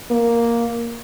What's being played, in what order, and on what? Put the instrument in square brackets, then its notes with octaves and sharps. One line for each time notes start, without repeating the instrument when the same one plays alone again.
[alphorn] A#3